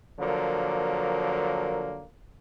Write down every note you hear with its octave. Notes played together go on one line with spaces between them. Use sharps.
D3 F3 F#3 A#3 A#4